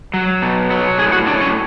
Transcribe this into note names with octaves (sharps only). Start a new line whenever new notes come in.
F#3
B2
F#3
A2 G#4
F#4
F#3 D4
C#4